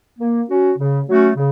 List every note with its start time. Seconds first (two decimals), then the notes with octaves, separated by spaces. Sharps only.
0.19 A#3
0.48 C#4 F#4
0.78 C#3
1.08 F#3 A3 C#4 F#4
1.37 C#3